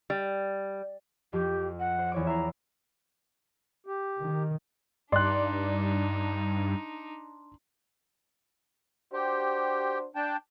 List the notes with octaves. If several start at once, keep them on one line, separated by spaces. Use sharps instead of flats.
G3
F2 G4
F#5
C5
E2 C#5 D6
E5 A#5 C7
G4
D#3
G2 D4 D#4 D5 C6 F#6
D4 F#4 G4 C5
D4 G5 A5